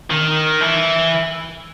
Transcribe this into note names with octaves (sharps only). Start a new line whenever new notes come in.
D#3
E3